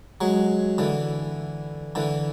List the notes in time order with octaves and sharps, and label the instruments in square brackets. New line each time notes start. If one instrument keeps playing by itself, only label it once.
[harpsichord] F#3 G#3
D3 E3
D3 E3